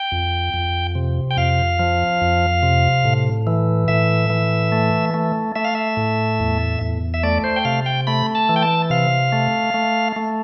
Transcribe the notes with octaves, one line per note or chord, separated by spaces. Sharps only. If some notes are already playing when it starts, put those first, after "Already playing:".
Already playing: G5
F2
F2
C3
G5
F2 F5
F3
F2
C3
A2
E3
A2 E5
E3
A3
A3
A3 E5
F5
E5
A2
E2
E2
E5
A3 D5
C5
G5
C3 F5
G5
A3 B5
A5
E3
G5
A5
C3 F5
A3
A3
A3